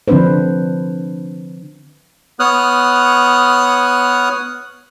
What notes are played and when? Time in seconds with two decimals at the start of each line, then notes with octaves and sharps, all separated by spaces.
0.08 D3 F3 C4 D4 B4 C5
2.40 B3 C#5 D#6 F6 F#6